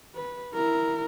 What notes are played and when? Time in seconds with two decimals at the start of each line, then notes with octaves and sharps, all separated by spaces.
0.15 B4
0.54 E4 A#4